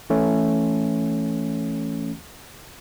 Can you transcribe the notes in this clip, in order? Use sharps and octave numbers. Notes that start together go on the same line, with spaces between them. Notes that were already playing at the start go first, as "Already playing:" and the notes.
E3 A3 C#4